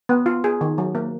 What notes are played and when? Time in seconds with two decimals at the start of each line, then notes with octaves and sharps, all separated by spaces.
0.09 B3
0.26 F4
0.44 G#4
0.61 D#3
0.78 F#3
0.95 A#3